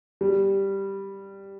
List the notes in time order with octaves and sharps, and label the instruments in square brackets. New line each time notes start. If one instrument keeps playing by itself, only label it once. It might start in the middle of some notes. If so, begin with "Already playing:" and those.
[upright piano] G3